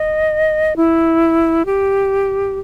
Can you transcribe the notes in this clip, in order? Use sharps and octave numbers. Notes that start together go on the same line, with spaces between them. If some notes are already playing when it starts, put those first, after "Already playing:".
Already playing: D#5
E4
G4